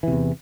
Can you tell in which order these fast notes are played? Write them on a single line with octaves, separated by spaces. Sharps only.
E3 C3 E2